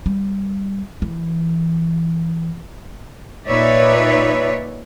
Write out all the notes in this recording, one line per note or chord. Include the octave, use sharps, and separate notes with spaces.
G3
E3
A#2 D#4 B4 C#5 D5 E5